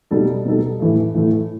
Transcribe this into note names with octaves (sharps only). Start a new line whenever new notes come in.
B2 G3 D#4 A4
B2 G3 D#4 A4
A2 E3 A3
A2 E3 A3